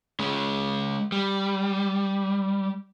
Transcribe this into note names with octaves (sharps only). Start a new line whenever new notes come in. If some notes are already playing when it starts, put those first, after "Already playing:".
G#3 C#4
G3